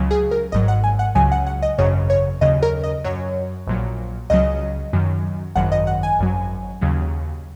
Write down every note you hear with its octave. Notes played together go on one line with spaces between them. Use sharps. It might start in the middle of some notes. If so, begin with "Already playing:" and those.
Already playing: C#2 C#3 F#3
G#4
A#4
G#1 G#2 F#3 D#5
F#5
G#5
F#5
C#2 C#3 F#3 G#5
F#5
F#5
D#5
G#1 F#2 C#3 F#3 C#5
C#5
D#2 C#3 F#3 D#5
A#4
D#5
F#2 F#3 C#5
A#1 A#2 F#3
C#2 C#3 F#3 D#5
F#2 D#3 F#3
G#1 F#2 D#3 F#3 F#5
D#5
F#5
G#5
G#1 F#2 F#3
D#2 C#3 F#3